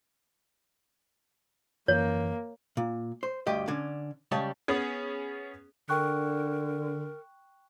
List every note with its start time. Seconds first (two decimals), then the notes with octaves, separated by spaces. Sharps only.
1.88 F#2 E3 A#3 C#5
2.77 A#2
3.23 C5
3.47 D2 G2 G4 D#5
3.68 D3 C#4 D4
4.32 C#3 G3 G#3 C#5 A5
4.68 B3 C#4 G#4
5.89 D3 A#4 G5 C#6 F#6